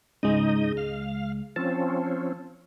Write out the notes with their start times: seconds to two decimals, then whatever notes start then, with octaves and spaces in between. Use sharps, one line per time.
0.23 C#2 G#2 G#3 D#4 D#5
0.77 F5
1.56 F3 C4 C#4 A5